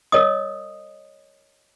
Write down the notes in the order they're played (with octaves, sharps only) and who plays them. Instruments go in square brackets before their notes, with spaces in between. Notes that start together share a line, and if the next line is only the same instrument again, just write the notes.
[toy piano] A#4 C#5 D#5 D#6